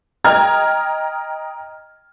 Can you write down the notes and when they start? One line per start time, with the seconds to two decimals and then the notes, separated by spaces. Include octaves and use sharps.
0.24 D#5 G5 A#5 F6 G#6